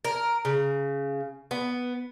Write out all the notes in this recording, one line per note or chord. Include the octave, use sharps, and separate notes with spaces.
A#4
C#3
B3